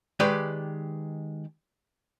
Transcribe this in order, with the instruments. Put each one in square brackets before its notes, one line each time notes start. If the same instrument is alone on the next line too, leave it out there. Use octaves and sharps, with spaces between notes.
[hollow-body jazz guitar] D#3 G#3 G4 B4 D5